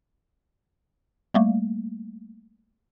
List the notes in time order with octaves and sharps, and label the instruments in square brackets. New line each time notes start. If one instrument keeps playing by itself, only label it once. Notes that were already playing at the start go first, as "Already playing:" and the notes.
[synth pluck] G3 A3 A#3